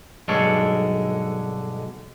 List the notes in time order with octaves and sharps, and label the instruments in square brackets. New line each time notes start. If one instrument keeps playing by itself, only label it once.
[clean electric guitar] B1 G2 D3 G#3 A4 C#5